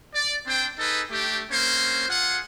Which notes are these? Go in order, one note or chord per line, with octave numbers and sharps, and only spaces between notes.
D5
C4 D4 C5 G5
D#4 G#4 A4 B4
A3 D4 G4
A#3 C4 C#4 C5
F4 G#4 F#5